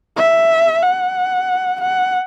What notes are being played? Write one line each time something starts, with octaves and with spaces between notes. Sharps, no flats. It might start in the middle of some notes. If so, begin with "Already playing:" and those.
E5
F#5
F#5